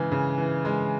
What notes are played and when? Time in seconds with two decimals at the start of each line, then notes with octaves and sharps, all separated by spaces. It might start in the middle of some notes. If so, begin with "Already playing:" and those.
Already playing: C#3 E3 G#3
0.11 C#3
0.38 E3
0.65 G#3